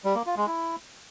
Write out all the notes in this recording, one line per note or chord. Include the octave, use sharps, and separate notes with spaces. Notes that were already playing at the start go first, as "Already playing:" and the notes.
G3
A#3
F4
G#3
E4